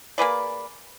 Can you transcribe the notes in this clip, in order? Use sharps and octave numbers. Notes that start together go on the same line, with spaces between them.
A#3 G#4 B4 D5